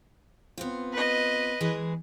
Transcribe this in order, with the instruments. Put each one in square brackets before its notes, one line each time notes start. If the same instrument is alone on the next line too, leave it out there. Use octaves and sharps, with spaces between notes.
[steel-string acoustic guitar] B3 C4 F4
[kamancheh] B4 D#5
[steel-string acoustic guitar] E3 G#3 G#4